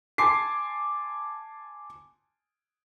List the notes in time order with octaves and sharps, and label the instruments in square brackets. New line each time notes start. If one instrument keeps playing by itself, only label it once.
[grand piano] G#5 A5 C6 D6 C7